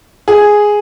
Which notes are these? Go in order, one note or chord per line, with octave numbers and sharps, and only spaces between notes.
G#4